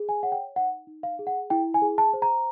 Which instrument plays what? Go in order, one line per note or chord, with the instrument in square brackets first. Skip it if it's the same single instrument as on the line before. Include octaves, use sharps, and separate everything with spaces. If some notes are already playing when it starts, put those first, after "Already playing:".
Already playing: [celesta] G#4
G#5
C#5 F#5
G5
D#4 F#5
D#4
F5
G#4
F#5
E4 G5
G#5
G#4
A5
C5
A#5